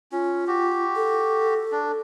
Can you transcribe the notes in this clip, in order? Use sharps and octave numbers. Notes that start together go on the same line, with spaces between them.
C#4 F4
F#4 G4
A4
D4